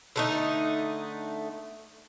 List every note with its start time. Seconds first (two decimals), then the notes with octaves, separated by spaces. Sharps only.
0.16 D3 A3 D#4